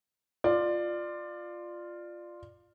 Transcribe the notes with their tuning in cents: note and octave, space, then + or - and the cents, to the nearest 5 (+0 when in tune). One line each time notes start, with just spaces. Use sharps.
F4 +0 D5 +20